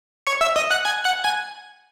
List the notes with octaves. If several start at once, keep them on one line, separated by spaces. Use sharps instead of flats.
C#5 C#6
E5 E6
D#5 D#6
F#5 F#6
G#5 G#6
F#5 F#6
G#5 G#6